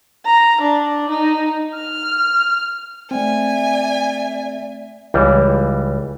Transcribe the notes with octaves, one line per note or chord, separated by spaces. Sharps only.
A#5
D4
D#4
F6
A3 C4 D5 E5 G#5
C#2 E3 G3